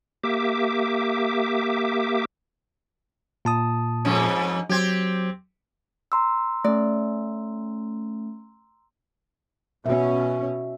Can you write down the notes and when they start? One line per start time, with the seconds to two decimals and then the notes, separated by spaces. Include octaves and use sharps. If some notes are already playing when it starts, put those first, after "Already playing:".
0.23 A#3 G4 E5 D6
3.45 A#2 A5 D#6
4.05 F2 G#2 C#4
4.70 F#3 C4 G4 G#6
6.12 A#5 C6 E6
6.64 A3 C#4 D5
9.86 B2 C#4 F#4 E5